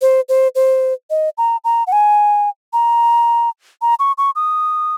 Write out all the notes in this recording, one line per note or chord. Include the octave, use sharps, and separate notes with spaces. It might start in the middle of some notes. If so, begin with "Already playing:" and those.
C5
C5
C5
D#5
A#5
A#5
F#5
G#5
A#5
A#5
C#6
C#6
D#6